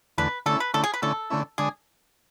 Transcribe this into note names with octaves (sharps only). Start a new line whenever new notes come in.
E2 D3 A3 B4
D3 A3 C#4 E4 A4
B4
D3 A3 C#4 E4 A4
G#4
B4
D3 A3 C#4 E4 A4
D3 A3 C#4 E4
D3 G#3 D4 G#4